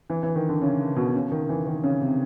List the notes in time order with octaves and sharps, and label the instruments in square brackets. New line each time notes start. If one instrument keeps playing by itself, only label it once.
[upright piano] E3
E3
D#3
D3
C#3
B2
C#3
D#3
E3
D#3
C#3
C3